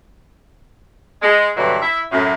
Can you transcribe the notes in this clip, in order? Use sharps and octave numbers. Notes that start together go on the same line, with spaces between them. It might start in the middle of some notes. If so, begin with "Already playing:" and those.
G#3
G2 B2 D3 E3 F#3
E4 E5
F#2 A2